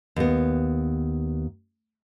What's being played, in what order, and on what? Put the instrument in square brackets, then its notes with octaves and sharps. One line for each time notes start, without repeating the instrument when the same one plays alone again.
[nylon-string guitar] D#2 B3